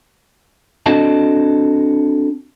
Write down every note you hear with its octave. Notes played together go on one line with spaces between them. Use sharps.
C4 D4 F#4 A4 D#5 A5